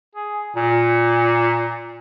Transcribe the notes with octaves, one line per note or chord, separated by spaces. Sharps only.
G#4
A#2